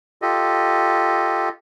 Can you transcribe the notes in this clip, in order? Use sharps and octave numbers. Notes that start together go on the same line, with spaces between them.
F4 G4 A4 D#5